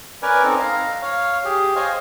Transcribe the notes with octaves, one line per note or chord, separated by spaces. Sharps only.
C#4 A#4 B4 D5 G#5
C4 D#4 A4
F5 A#5
C#5 F5
G4 G#4
C5 C#5 D#5 F5 G#5